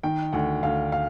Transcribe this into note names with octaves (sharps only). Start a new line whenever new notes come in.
D#3 G5
D2 F#5
D2 F5
F5